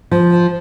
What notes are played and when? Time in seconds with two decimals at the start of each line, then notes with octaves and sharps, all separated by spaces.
0.11 F3